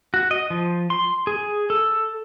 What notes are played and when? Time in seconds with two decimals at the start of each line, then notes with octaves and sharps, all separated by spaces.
0.14 F#4
0.31 D#5
0.50 F3
0.90 C6
1.27 G#4
1.70 A4